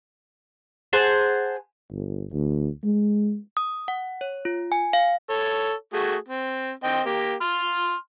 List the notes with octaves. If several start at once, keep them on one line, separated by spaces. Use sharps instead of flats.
G#4 C5 F#5 A5
G1
D2
G#3
D#6
F#5
C#5
F4
G#5
F5
A4 C#5
A3 F#4 G#4
C4
C4 D#5 G5
A#3 G4
C6 F6